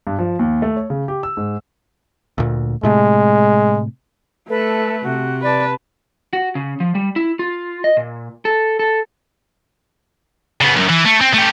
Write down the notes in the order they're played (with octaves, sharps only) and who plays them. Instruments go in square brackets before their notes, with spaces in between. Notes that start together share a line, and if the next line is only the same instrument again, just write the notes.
[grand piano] G2
F3
D#2
A3
C#5
C#3
G4
E6
G#2
[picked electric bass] D2 A#2
[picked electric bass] A2 C3 A3 [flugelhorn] G#3
[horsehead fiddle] A3 [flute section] A4 B4
[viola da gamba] C3 [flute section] F#4
[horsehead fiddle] B4 A5 [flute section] D5
[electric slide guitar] F#4
C#3
F3
G3
E4
F4
D#5
A#2
A4
A4
[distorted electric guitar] C#3 B3
B1 F#2
E3
A3
C4
A3 G4